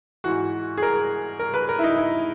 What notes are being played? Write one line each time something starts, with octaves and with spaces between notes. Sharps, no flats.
G#2 E3 F#4
G#4
A#4
A#4
B4
A#4
E4
D#4
E4